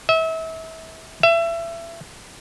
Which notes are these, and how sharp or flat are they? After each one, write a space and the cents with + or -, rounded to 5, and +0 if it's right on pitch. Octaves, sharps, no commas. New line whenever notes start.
E5 -35
E5 +25